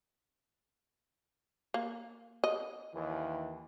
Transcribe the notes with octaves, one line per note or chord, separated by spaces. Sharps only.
A#3
D#5
D#2 E3